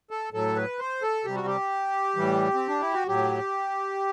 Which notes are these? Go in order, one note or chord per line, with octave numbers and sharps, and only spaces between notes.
A4
A2 F#3 A4
B4
C5
A4
C3 G3 G4
F#4
G4
A2 E3 G3
C4
D4
E4
F#4
A2 F#3 G4